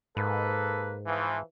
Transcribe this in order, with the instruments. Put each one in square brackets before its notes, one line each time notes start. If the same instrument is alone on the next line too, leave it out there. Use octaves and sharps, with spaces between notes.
[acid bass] G#2 [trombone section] A#3 A4 B4
[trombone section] E3 F3